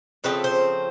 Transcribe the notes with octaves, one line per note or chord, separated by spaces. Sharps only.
C#3 F3 A3 C4 B4
C5